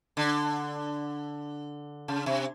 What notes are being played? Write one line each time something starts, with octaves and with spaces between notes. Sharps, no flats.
D3
C#3
C3